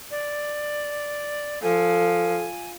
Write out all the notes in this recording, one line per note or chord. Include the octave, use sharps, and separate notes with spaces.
D5
F3 A4 G#5